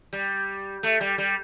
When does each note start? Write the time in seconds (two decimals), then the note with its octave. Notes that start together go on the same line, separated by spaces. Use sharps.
0.13 G3
0.83 A3
1.01 G3
1.18 G3